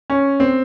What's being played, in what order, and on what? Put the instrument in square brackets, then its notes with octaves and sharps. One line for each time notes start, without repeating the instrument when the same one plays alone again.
[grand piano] C#4
C4